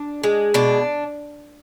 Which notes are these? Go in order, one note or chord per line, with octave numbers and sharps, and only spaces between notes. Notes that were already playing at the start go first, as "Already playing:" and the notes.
Already playing: D4
G#3
B2 D4